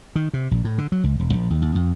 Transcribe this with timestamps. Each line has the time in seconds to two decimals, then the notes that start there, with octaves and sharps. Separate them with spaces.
0.16 D#3
0.34 C3
0.51 A#1
0.65 A2
0.78 D3
0.92 F#3
1.04 C#2
1.19 E1
1.33 A#1
1.50 D#2
1.62 D#2
1.75 F2